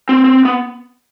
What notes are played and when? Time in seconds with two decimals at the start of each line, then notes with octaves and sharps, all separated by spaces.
0.09 C4
0.24 C4
0.45 B3